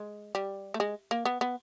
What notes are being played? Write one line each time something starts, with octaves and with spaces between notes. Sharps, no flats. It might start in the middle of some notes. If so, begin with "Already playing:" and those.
Already playing: G#3
G3
A3
G#3
A#3
B3
B3